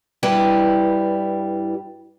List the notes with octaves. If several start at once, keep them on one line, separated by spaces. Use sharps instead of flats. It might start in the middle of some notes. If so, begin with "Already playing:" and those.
G2 G3 E4 B4 G5